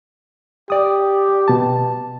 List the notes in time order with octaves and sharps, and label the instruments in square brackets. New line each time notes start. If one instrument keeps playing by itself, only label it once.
[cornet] G4 [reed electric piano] D5 D#6
[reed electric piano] B2 A5